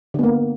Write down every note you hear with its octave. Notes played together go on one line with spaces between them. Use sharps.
D3 A#3 B3